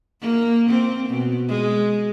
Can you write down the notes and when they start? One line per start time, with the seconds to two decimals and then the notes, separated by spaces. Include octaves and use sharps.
0.21 A#3
0.70 C4
1.09 B2
1.48 G#3